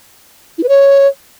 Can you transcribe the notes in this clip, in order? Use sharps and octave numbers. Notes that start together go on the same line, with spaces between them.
E4
B4
C#5